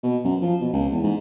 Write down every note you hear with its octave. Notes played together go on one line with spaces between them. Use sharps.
B2
F#2
F3
B2
C#2
E2
G#2